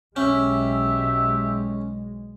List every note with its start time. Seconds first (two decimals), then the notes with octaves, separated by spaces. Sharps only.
0.16 B1 G#3 C#4 G4 E5